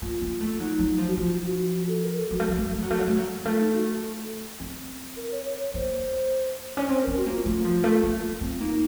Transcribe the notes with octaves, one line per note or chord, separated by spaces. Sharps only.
A#3 F4
A#3
A3
F#3 D#4
F#3
F3
F#4
F3 F4
F#4
F#4
A4
A#4
A4
F#3 F#4
A3
F#3
A3
F#3
A3
F#3
A3
F#3
A3
F#3
A3 F4
D#4
F#4
A4
C4
A#4
C#5
C#5
C#5
A#3 C5
C#4
C4 C5
C4 A#4
F#4
A#3
F4
A3 F4
F3
A3
A#3
C4
A#3 D#4